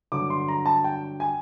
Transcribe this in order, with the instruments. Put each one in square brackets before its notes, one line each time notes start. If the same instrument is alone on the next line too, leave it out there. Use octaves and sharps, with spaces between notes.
[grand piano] G2 D3 F#3 D6
C6
A#5
A5
G5
G#5